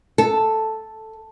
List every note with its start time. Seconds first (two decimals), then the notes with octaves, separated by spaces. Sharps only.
0.18 A4